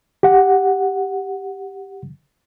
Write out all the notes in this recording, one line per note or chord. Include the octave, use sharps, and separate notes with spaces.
G4 F#5